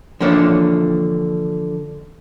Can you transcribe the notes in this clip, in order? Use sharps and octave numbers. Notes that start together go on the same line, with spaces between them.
D3 E3 F3 A#3 D4 C#5